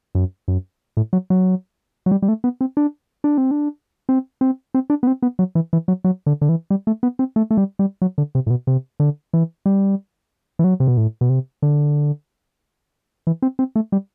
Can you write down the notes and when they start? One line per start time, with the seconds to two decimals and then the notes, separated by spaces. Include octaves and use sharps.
0.15 F#2
0.48 F#2
0.97 A2
1.13 F#3
1.30 F#3
2.06 F#3
2.11 G3
2.22 G3
2.28 A3
2.44 B3
2.61 C4
2.77 D4
3.24 D4
3.38 C4
3.51 D4
4.09 C4
4.41 C4
4.74 C4
4.90 D4
5.03 B3
5.07 C4
5.22 B3
5.39 F#3
5.55 E3
5.73 E3
5.88 F#3
6.04 F#3
6.26 D3
6.41 D3
6.49 E3
6.70 G3
6.87 A3
7.03 B3
7.19 C4
7.36 A3
7.51 A3
7.57 G3
7.79 G3
8.02 F#3
8.18 D3
8.35 C3
8.46 A2
8.50 B2
8.67 C3
9.00 D3
9.33 E3
9.66 G3
10.59 E3
10.64 F#3
10.80 C3
10.87 B2
10.97 A2
11.21 B2
11.29 C3
11.62 D3
13.27 E3
13.42 C4
13.59 C4
13.76 A3
13.92 G3